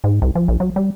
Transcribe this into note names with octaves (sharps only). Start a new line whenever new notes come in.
G#2
C2
F3
A#1
F#3
G3